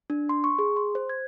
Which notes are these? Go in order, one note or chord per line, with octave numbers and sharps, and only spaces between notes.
D4
C6
C#6
G#4
C6
C5
G#6